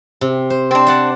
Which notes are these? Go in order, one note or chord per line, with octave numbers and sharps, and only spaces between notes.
C3
C5
C4 D4
D5 F#5 A5